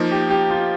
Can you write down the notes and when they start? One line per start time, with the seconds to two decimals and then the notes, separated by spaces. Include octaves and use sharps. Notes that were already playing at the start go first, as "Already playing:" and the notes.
Already playing: F3 A#3 D#4
0.12 G4
0.30 G4
0.50 F4